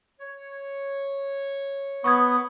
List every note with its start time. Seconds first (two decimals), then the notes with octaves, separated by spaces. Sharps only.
0.20 C#5
2.04 B3 C#6 D#6 G#6